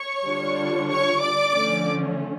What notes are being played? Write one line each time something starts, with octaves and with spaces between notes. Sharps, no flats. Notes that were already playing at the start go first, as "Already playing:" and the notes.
Already playing: C#5 C#6
D3 G3 D4 F4
C#5 C#6
D5 D6
D3 F3 A3 C#4